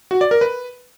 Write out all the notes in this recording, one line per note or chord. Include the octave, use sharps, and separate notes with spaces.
F#4
D5
A#4
B4